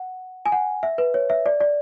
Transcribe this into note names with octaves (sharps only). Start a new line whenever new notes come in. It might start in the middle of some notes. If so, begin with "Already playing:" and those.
Already playing: F#5
G#5
F#5
E5
B4
C#5
E5
D5
D5